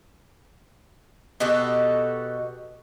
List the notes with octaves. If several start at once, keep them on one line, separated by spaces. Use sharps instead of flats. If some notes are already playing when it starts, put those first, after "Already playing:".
B2 F#4 G4 A4